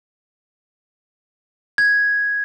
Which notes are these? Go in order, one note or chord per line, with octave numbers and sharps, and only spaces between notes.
G#6